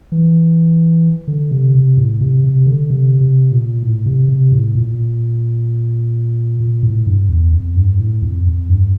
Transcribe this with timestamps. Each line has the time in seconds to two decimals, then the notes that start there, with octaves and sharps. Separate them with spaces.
0.12 E3
1.27 D3
1.51 C3
1.75 C3
1.97 A2
2.21 C3
2.44 C3
2.66 D3
2.90 C3
3.21 C3
3.52 A#2
3.83 A2
4.06 C3
4.28 C3
4.52 A2
4.75 A#2
6.60 A#2
6.83 A2
7.07 G2
7.29 E2
7.53 F2
7.76 G2
7.99 A2
8.22 F2
8.46 F2
8.69 G2